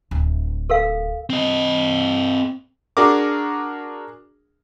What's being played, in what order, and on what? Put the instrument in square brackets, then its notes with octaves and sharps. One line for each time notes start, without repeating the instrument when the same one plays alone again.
[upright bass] D1
[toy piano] A4 A#4 F5
[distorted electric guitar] C4 D#5
[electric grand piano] D4 F#4 G#4 A#4 D6